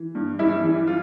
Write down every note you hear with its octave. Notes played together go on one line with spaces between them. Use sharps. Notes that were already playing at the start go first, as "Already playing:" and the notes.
Already playing: E3
G2
G3 E4
E3
F4